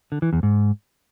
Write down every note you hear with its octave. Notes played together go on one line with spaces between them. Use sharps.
D3
E3
E2
G#2